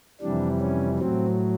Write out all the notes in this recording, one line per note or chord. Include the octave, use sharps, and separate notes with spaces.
F2 C3 E3 G3 D4
C#4
A2 F#3 C4